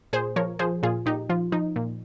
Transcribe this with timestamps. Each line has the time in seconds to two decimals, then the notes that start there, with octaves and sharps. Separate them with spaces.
0.13 A#2 G#4 C5
0.36 F3 A#4 C#5
0.59 F3 G#4 C5
0.83 A#2 F4 G#4
1.06 A#2 D#4 G4
1.30 F3 F4
1.52 F3 D#4
1.76 A#2